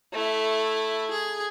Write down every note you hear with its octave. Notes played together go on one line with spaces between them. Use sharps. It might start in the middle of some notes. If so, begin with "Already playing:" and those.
A3 E4
G#4